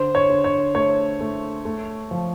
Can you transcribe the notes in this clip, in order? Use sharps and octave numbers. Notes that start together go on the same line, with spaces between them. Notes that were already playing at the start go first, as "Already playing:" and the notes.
Already playing: D3 C5
C#5
D3
C#5
A3 C#5
A3
A3
F3